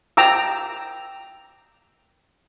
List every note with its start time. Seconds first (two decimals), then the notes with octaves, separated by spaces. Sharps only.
0.17 G5 A#5 D6 E6